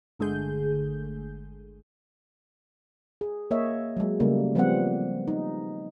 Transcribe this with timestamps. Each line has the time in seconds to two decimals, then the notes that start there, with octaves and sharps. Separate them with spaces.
0.19 G1 D3 G#3 A3 G#4 G6
3.21 G#4
3.51 A#3 C#5 D#5 E5
3.97 F#3 G#3
4.20 C#3 G3 A3 A#3
4.55 F3 G3 B3 C4 F#5
5.28 D#4